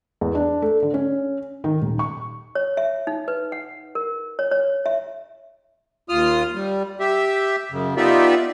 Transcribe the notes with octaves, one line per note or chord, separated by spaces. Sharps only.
E2
D4
A3
D3
C#4
D#3
D#1
C#6
C#5
E5
D#4
B4
F#5
A#4
C#5
C#5
E5
D#2 F4 D#6 F6
G3
G4 E5
F#2 C#3
B3 D#4 F4 G4 D5 E5